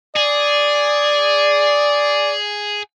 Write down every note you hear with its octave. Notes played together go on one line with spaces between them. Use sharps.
G#4 D5